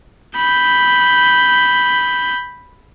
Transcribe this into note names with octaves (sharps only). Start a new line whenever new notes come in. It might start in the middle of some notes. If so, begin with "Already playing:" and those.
B5 G6